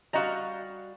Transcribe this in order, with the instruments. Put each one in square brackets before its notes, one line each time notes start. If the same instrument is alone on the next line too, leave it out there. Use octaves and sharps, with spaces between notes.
[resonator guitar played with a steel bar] G3 F#4 F5 [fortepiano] D#5 A#5